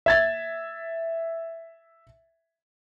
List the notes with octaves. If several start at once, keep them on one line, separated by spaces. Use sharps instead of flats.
E5 G#6 A6